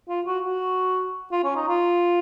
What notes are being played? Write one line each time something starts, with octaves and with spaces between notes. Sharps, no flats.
F4
F#4
F#4
F4
C#4
D#4
F4